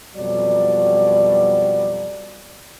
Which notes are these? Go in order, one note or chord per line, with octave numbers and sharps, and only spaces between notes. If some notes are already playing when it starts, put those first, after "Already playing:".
F2 B2 F#3 G3 D5